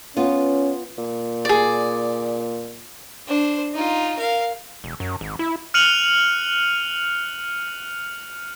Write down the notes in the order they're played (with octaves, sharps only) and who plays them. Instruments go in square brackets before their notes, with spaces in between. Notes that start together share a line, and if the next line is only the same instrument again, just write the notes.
[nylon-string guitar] B3 F4 [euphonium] C#4
[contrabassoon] A#2
[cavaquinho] G#4 D5
[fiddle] D4 C5
D#4 F4
A#4 F5
[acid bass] E1
F#2
G#1
E4
[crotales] F6 F#6 C#7 D#7 F7 F#7